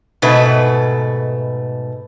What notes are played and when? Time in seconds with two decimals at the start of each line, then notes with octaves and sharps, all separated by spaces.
0.22 G#2 B2 A3 B4